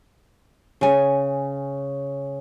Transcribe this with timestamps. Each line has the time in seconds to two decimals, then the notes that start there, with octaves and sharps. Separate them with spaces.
0.81 C#3 G#5